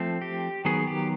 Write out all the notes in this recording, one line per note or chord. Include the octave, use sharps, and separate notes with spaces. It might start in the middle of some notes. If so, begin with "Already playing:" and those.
Already playing: F3 A3 C4
G4
D#3 F#3 B3 G#4
G4